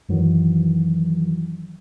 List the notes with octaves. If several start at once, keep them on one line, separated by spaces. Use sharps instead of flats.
F#2 D#3 E3 F#3